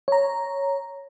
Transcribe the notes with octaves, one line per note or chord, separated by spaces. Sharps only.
C#5 A#5